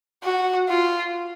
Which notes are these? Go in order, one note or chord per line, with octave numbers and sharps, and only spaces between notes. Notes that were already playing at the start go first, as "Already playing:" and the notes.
F#4
F4